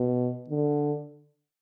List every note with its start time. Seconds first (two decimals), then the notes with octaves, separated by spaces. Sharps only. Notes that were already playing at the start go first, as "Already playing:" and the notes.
Already playing: B2
0.49 D3